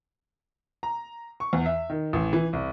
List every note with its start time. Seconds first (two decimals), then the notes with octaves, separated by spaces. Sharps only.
0.83 A#5
1.40 C#6
1.53 E2
1.66 E5
1.90 D#3
2.13 A1
2.33 E3
2.53 C2